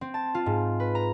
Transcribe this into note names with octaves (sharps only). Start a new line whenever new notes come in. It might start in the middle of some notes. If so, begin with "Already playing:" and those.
C4
A5
F4
G#2
B4
A#5